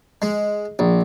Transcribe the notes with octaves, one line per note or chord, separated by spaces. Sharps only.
G#3
A#1